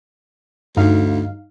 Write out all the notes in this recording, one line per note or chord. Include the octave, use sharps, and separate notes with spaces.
D2 G2 D#4 F5